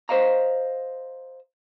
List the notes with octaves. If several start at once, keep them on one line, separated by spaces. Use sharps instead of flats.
C5 D#5 F5 A#5